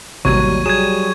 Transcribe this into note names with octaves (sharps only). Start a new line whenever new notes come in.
A1 D#2 C3 F#3 G3 C#6 G#6 D#7
F#3 G3 G#4 G#6 D#7 E7